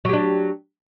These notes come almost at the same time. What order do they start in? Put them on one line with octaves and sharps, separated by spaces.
F#3 G4 D4